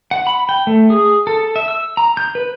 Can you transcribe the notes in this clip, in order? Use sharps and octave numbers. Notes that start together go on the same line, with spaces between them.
F#5
B5
G5
A3
G#4
A4
E5
E6
A#5
G6
B4